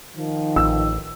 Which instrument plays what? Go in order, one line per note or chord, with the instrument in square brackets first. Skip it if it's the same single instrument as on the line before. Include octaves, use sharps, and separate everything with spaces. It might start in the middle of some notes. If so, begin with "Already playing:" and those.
[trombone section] D#3 F3
[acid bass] A1 [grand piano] E6